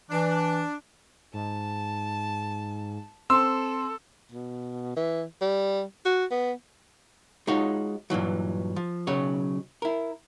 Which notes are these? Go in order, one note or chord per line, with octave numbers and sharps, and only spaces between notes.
E3 D4
G#2 A5
C4 A4 C6 E6
B2
E3
G3
F#4
B3
G#3 D#4 F4 F#4 C#5
G2 A#2 E3 F#3
F3
B1 C#3 F#3 C#5
E4 A#4